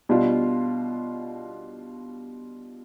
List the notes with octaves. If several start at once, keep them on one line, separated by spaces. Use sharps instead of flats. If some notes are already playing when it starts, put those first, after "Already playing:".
B2 G3 D4 F4